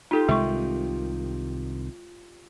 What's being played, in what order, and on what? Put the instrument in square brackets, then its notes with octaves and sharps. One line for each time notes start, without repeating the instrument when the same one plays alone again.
[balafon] D#4 A4 [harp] F4 G4
[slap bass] C2 C3 D#3 [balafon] G#3 C#6